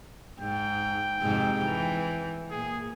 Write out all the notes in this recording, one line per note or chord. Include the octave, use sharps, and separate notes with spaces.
G#2 G5
F2 G#2 C3
E3
A#2 G#4